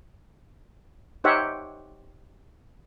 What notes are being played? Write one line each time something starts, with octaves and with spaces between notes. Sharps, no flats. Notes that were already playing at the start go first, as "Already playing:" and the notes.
D#4 G4 C5 C#5 E5 F#5